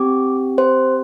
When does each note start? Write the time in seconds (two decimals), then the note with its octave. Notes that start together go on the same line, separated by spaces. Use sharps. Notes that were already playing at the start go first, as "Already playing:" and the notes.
Already playing: C4 G4 D6
0.58 C5